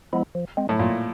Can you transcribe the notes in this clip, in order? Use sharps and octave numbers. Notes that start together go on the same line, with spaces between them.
F3 G#3 B3 E4
F3
G#3 C4
A2
G2 A#2